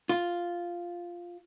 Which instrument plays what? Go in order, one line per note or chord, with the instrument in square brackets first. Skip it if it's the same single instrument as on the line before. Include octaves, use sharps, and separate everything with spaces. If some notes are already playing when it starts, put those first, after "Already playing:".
[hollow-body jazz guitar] F4